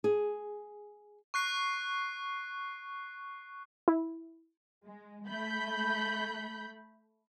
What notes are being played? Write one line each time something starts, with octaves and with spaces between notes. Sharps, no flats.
G#4
C#6 F#6 C7
E4
G#3
A3 B5 G6